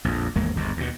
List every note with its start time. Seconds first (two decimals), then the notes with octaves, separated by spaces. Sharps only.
0.05 A#1 F2
0.36 G#1 E2 G#3 A#3
0.56 G1 D#2 G#2
0.77 D#2 B2